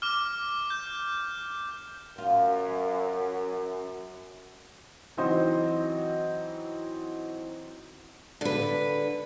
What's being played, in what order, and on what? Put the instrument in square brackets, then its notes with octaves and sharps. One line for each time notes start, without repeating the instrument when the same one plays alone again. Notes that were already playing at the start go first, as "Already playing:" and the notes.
[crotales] D6 F6
G6
[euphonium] F#2 [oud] F4
[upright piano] E3 F#3 C4 D#4 C5 D#5
[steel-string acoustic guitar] D3 B4